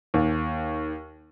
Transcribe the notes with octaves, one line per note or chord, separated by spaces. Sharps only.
D#2